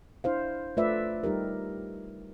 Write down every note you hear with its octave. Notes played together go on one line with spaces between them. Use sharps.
D4 E4 C5 F5
A3 F4 B4 C5 D5 E5
G3 D#4 G4 A#4